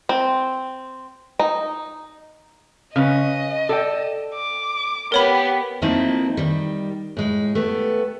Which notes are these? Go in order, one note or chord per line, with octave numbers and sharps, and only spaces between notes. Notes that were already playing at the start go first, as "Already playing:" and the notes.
C4
D#4
C#3 C#4 B4 D#5
A4 D5 G5
D6
B3 G4 A#4 C#5 B5
F3 A3 A#3 C4 D#4 E4
D#3 G3
A2 G#3
A3 B3 G4